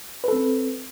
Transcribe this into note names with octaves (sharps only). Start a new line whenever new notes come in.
C4 A4 B4